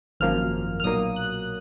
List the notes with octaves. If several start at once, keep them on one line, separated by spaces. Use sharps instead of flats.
G#1 F#2 F3 A#3 F6
F6
B1 A#2 F#3 A#3 D#6
F#6